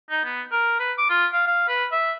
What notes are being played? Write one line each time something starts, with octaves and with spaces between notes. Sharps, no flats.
D#4
B3
A#4
B4
D6
F4
F5
F5
B4
E5